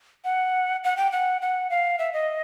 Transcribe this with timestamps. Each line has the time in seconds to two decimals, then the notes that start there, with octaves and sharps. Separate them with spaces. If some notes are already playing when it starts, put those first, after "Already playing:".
0.24 F#5
0.84 F#5
0.97 G5
1.12 F#5
1.41 F#5
1.70 F5
1.99 E5
2.13 D#5